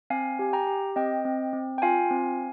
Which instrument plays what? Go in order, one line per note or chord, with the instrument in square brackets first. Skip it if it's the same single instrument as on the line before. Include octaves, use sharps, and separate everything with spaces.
[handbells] C4 F5 G#5
G4 G#5
G5 A#5
G4
C4 D#5 G5
C4
C4
G5
F4 F5 G#5
C4